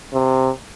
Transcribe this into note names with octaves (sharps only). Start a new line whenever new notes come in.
C3